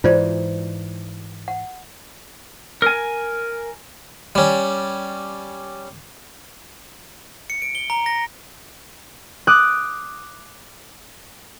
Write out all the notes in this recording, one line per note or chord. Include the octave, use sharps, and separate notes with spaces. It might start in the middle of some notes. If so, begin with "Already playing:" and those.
G#2 E3 F4 C5 D5
F#5
A#4 G#5
G3 C#4
C#7
D7
G7
A#5
A#6
D6 D#6 F#6